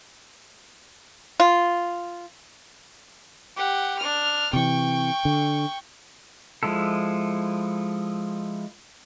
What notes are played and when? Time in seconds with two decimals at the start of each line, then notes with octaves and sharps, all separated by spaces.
1.40 F4
3.57 G4 F#5
3.99 D4 F6
4.53 C3 E3 G5 C#6
5.25 D3
6.63 F3 G#3 E4 A4